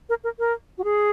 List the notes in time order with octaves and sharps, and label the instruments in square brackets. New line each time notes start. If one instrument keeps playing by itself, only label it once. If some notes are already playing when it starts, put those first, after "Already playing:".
[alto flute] A#4
A#4
A#4
F#4
G#4